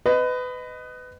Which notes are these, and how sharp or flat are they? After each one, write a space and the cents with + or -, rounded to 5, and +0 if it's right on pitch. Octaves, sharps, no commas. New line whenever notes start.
B4 +25 D#5 +0